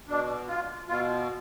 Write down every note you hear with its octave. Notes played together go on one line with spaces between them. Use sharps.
B2 D4
F4
B2 F4